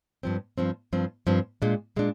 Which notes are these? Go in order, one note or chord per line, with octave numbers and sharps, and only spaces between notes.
G2 F3 C4
G2 F3 C4
G2 F3 C4
G2 F3 C4
A#2 G#3 D4
A#2 G#3 D4